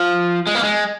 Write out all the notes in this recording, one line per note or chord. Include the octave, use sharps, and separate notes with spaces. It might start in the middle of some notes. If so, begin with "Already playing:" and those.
Already playing: F3
G#3
A#3
G#3